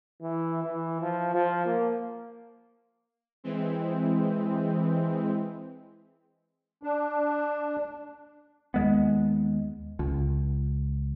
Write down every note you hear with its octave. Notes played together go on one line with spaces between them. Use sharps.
E3
E3
F3
F3
A#3
E3 G#3 C4
D4
D#2 G#3 B3
C#2